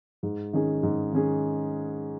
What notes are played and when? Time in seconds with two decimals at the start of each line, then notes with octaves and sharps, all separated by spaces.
0.23 G#2
0.53 D#3 C#4 G#4
0.83 G#2
1.13 D#3 C#4 G#4